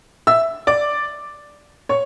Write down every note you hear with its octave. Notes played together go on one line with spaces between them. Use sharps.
E5 E6
D5 D6
C#5 C#6